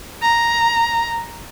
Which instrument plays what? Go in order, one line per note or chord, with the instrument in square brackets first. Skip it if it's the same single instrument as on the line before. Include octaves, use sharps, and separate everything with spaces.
[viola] A#5